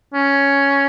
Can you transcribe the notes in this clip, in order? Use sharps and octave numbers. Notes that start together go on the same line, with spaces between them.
C#4